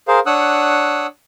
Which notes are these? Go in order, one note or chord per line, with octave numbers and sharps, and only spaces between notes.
G#4 A#4 C5 F5
D4 C#5 F#5 D#6 E6 F#6